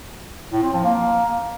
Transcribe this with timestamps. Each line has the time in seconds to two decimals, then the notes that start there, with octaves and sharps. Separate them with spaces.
0.52 A2
0.63 C4
0.73 F3
0.84 A#3